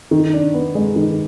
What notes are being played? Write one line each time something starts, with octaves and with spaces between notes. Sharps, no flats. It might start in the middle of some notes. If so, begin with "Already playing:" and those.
D#3
D4
B3
G#3
D#3